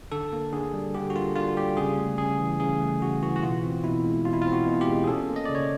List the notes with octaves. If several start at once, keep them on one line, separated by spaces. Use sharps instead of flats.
D3 A4
A#3
D3 G#4
G3
D3 G4
F#4
A#3 F4
D3 F4
G3 G4
C#3 G#4
A3
C#3 G#4
E3
C#3 G#4
A3
C#3 F#4
E3 F#4
F#4
B2 F4
C4
B2 E4
G#3
B2 F4
E4
C4 F4
F#4
B2
G4
G#3
G#4
C#4 A4
A#3
D#5
C#3 D5
C#5